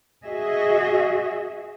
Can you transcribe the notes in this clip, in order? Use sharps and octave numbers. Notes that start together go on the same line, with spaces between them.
F#4 G#4 D#5 E5